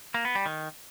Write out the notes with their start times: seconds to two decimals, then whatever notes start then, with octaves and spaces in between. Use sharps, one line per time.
0.14 A#3
0.25 B3
0.35 G3
0.46 D#3